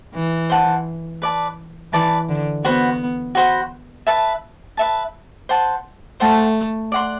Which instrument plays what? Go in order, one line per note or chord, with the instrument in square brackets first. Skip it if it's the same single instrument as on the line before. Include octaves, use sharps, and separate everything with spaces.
[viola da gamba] E3
[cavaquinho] C5 F#5 A5 C6
B4 D5 A5
[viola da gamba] E3 [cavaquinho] B4 D5 A5
[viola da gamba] D3
[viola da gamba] B3 [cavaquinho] F#4 C5 F#5 B5
[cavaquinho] F#4 C5 F#5 B5
B4 E5 A5
B4 E5 A5
C5 F#5 A5 C6
[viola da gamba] A3 [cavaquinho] C5 F#5 A5 C6
[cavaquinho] D5 F#5 C6